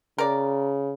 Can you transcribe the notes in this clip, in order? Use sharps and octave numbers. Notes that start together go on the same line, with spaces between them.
C#3 A#4 D5